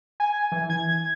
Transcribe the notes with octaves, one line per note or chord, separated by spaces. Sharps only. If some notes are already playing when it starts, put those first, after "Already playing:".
G#5
E3
G#6